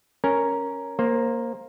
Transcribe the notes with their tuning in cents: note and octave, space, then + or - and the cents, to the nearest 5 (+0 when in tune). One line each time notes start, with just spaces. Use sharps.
C#4 +0 A#4 +0
A#3 +0 C5 +20